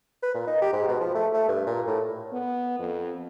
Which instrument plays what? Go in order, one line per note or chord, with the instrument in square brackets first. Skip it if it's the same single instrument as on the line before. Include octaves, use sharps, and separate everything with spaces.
[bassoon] B4
A#2
D#4
G4
G#2
B2
F3
A3
A3
G2
A#2
A2
[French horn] B3
F2